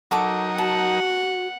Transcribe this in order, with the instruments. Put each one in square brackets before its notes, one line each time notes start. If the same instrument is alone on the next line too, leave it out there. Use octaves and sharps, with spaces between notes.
[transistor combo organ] F#3 D#4 A#4 [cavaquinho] F#4 A4 D6
[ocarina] F#4 [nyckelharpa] F#5 [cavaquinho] A5